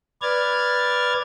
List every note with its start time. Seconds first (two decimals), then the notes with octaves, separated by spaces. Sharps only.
0.22 B4 D5 F6 G#6 A6